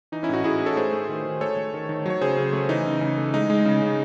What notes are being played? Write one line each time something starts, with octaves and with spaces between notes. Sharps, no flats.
E3 D#4
C#4 E4
A2 D#4 F#4
A2 E4 G#4
A3
A4 C#5
A3 G#4 C5
A3
D#3
D#3
A3 A4 C#5
A3
D#3
D#3
F#3 C#5
C#3 G#4 C5
C#3
A3
E3 D#4
C#3
C#3
A3
G#3 D#4
G#3
C#3
C#3